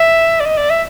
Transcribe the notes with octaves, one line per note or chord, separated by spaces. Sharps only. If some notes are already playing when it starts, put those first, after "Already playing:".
Already playing: E5
D5
D#5
D5
E5